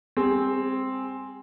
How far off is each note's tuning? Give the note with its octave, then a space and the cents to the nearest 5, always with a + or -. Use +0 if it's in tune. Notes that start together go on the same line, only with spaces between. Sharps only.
G3 +40 C4 +0 G#4 +0